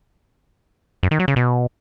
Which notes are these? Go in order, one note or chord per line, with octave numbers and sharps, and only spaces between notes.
F#2
D#3
F#3
C#3
B2